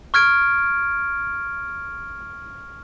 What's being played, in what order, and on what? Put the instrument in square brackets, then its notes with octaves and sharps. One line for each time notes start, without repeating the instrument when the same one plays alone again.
[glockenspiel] C#6 F6 G#6 D7